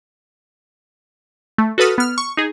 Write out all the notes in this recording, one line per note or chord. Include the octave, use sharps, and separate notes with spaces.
A3
F#4 A4 B4 D#6 F6
B3 F6
C#6
D#4 G#4